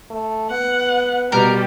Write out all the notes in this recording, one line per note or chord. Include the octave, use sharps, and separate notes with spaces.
A3
B3 F#5
B2 G3 B3 G4 A#4